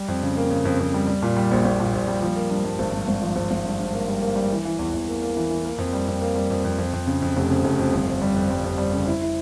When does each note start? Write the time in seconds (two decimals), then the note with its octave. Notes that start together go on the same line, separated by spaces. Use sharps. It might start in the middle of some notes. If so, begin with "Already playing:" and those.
Already playing: G3
0.08 F2
0.22 C#3
0.37 A#3
0.50 C#3
0.65 F2
0.80 F2
0.94 G3
1.07 G3
1.22 A#2
1.37 G3
1.51 A#1
1.65 A#1
1.80 A#2
1.93 A#1
2.08 G3
2.22 F3
2.36 A#3
2.50 G2
2.64 G2
2.79 G#1
2.94 G2
3.08 G#1
3.22 F3
3.36 G#1
3.51 G#1
3.65 G2
3.79 G2
3.93 A#3
4.08 G3
4.22 A#3
4.36 G3
4.51 E3
4.65 E3
4.79 E2
4.94 E2
5.08 A#3
5.22 A#3
5.37 E3
5.51 E3
5.65 A#3
5.78 F2
5.93 G3
6.08 F2
6.21 A#3
6.35 G3
6.51 F2
6.65 F2
6.78 F2
6.93 F2
7.07 C#3
7.22 F2
7.36 F1
7.50 C#3
7.64 F1
7.79 F2
7.93 G1
8.07 G1
8.22 G3
8.36 F2
8.50 G3
8.64 F2
8.78 G3
8.92 C#3
9.07 E4
9.22 E4